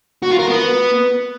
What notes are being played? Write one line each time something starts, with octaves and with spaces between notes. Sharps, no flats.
F#4
F4
A#4
B3